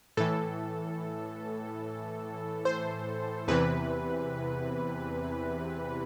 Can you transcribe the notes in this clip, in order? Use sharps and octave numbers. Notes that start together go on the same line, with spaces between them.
A2 E3 A4
C5
E2 C3 E3 B4